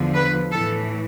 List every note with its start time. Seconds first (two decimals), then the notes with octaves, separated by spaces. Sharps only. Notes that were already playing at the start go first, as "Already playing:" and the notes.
Already playing: E2 D3 F3
0.14 B4
0.51 A2 E3 A4